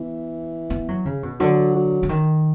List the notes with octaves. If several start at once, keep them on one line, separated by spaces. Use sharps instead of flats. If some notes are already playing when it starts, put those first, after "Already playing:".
Already playing: E3 B3
B3
F#3
C#3
B2
D3 F#3
F#3
D3
D#3